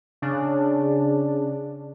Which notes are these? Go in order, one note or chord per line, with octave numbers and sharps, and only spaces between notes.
C#3 D4